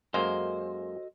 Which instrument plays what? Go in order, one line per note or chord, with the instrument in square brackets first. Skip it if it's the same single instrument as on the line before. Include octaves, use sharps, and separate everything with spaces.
[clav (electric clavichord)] F#2 G#3 A#3 [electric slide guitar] F#4 A4 D#5 [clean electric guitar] C5